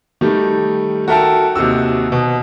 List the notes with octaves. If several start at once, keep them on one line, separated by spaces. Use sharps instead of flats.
D#3 G3 A3
F#4 A4 A#4 E5 G5 A5
D#2 C3 D#4 F#4 E6
B2